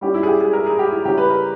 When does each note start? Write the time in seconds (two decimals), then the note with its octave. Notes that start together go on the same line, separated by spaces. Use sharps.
0.01 G3 C#4 E4 G4
0.14 E4
0.23 G#4
0.28 G4
0.40 G#4
0.53 A#4
0.66 G#4
0.79 G4
0.91 E4
1.05 C#3 G3 C#4 E4 G4
1.18 B4
1.30 A#4